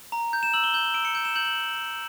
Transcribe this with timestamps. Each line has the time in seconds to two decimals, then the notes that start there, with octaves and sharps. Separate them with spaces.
0.12 A#5
0.33 G6
0.43 E7
0.54 E6 F#7
0.64 G7
0.74 G6 G7
0.84 E7
0.94 E6 D7
1.05 C#7
1.15 G6 D7
1.25 E7
1.35 G6 F#7
1.46 F#7